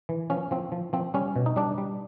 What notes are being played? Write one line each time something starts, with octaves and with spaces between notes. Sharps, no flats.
E3
F3 C#4
F3 C4
F3
F3 C4
G3 C#4
B2
D#4
G3 D4
G3